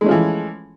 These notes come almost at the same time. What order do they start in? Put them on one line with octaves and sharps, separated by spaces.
G#3 A3 C#4 F3 E3